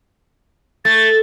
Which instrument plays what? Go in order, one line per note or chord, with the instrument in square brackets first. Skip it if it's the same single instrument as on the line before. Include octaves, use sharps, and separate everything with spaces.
[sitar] A3 [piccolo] A6